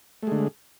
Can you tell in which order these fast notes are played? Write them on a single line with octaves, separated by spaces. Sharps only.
A3 G#3 D3